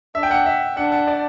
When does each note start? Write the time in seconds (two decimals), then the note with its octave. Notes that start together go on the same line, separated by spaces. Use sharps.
0.15 D4 E5
0.23 G5
0.31 F#5
0.46 E5
0.77 D4 F#5
0.92 F#5
1.08 D5